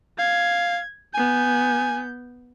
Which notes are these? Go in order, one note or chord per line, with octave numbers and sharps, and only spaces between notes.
F5 G#6
B3 G#5 G6